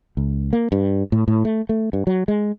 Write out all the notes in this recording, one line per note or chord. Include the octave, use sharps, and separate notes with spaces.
C#2
A#3
G2
A2
A2
A3
A3
G2
F#3
G#3